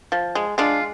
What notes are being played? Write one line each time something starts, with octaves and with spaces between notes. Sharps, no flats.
F3
G#3
G#3 D4 F4